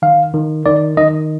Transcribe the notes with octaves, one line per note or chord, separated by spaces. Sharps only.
D#3 F5
D#3
D#3 D5
D#3 D#5